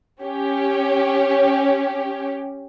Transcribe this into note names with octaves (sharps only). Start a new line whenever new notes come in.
C#4 G4